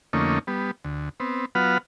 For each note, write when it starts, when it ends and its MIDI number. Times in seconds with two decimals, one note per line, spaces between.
0.13 0.39 41
0.13 0.39 50
0.13 0.39 57
0.13 0.39 58
0.13 0.39 61
0.13 0.39 63
0.47 0.71 55
0.47 0.71 59
0.85 1.09 38
1.20 1.45 59
1.20 1.45 60
1.55 1.78 54
1.55 1.78 59
1.55 1.78 65
1.55 1.78 71
1.55 1.78 78
1.55 1.78 89